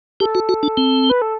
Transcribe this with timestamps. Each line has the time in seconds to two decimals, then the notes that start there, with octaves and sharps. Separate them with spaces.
0.20 G4 A4
0.35 F#4
0.49 F#4
0.63 D4
0.77 C4
1.10 B4
1.22 A4